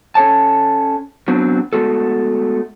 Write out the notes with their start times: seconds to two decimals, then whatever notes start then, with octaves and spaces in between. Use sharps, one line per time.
0.15 C#4 A4 C#5 A5
1.28 F#3 B3 C4 D4
1.73 G#3 A3 B3 F#4 A4